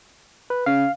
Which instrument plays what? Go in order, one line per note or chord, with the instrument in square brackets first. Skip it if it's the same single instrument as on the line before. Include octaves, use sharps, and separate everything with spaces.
[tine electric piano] B4
[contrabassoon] C#3 [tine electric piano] F5